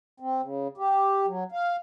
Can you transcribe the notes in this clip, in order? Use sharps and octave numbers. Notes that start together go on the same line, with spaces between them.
C4
C#3
G4
F#3
F5